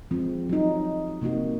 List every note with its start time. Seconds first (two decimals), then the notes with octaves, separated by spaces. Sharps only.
0.11 F3 G#3 C4
0.49 F#3 D#4
1.22 C3 A#3 D#4 F#4